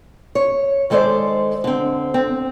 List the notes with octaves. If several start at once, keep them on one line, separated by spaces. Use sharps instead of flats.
C#5
D#3 G#3 A4 C5 D5
D3 C4
C4